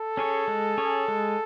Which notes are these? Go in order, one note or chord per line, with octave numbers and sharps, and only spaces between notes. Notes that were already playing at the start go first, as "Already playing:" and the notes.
Already playing: A4
C#4 G#4 C#5
G#3
C#4 G#4 C#5
G#3